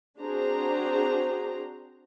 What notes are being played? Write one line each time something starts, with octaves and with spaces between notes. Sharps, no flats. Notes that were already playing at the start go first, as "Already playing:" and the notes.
C4 D4 F#4 G#4 C5 A#5